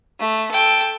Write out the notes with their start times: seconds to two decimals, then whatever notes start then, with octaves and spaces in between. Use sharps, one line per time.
0.20 A3
0.51 A4 G5